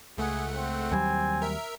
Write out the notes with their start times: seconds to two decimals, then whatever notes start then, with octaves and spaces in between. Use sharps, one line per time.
0.18 C#2 A3 G#4 F#5
0.55 C4
0.92 D#2 F#3 G3 G#5
1.42 A#4 E5